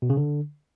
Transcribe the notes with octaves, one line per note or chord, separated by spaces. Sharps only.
B2
C#3
D3